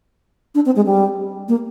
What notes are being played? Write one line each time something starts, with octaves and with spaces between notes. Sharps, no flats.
D4
C4
G#3
G3
A#3